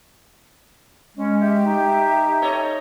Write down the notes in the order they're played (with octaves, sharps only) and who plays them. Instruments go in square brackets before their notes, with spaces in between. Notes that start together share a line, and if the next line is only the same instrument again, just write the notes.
[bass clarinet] G#3 [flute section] C#4
[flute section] G4 E5
[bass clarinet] D#4
[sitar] A4 C#5 D#5